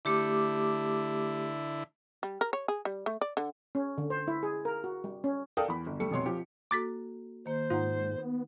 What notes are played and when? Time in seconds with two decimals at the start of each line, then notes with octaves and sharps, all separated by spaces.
0.05 D3 A3 E4 G4 D6
2.23 G3
2.41 A#4
2.53 C#5
2.68 G#4
2.85 G3
3.06 A3
3.21 D5
3.37 D3
3.75 C#4
3.98 D3
4.10 C5
4.28 E4
4.43 G#4
4.65 A#4
4.84 F#4
5.04 G3
5.24 C#4
5.57 A4 A#4 D5 F5 G5 D#6
5.68 E2 B5
5.86 G1
6.00 G3 A3 C#7
6.11 F1 B2 C#5 C6
6.26 F3 G4
6.71 A#3 F#4 A4 D6 A6 B6
7.46 D#3 A#3 C5
7.70 G#2 D#4 F4 F#5 A#5
8.17 B3